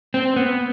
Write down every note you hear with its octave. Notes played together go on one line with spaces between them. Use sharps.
C4
B3